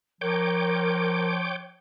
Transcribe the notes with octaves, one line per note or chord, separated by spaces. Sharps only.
F3 A#4 C#5 G5 D6